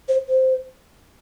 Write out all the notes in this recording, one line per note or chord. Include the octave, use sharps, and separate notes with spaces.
C5
C5